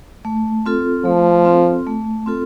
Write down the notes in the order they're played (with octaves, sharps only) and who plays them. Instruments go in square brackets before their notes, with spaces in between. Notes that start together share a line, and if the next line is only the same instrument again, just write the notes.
[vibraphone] A3
C4 F4 A4
[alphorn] F3 [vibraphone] A3
[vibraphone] C4 F4 A4
A3
C4 F4 A4